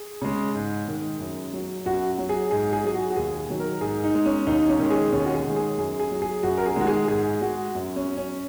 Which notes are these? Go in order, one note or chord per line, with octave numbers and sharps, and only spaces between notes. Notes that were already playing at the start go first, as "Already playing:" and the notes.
Already playing: G#4
C#3 G#3
G#2
D#3 G#3
F#2
F#3
F#2 F#4
F#3
G#4
G#2 G#4
G#4
F#3 G#4
F#4
F#4
D#2 G#4
D#3 F#3
A#4
G#2 G#4
D#4
G#3
C#4
D#2 D#4
C#4
D#3 G#3
G#4
D#2 C#4
F#4
G#4
D#3 G#3
G#4
F#2 G#4
G#4
F#3
G#4
F#2 F#4
A#4
G#4
D#3 G#3 F#4
G#4
G#2 G#4
G#3 F#4
F#2
C#4
F#3
C#4